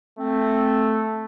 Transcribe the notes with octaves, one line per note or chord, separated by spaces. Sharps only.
A3 C4